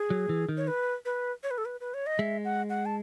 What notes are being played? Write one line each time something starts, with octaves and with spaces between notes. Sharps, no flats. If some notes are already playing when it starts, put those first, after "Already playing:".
Already playing: G#4
F#3
E3
D#3
C#5
B4
B4
C#5
B4
A4
B4
B4
C#5
D#5
G#3 E5
F#5
F#5
A5